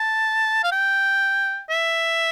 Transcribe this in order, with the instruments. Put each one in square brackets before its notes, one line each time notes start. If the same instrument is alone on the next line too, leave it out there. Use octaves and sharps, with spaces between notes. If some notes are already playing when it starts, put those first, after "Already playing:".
Already playing: [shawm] A5
F5
G5
E5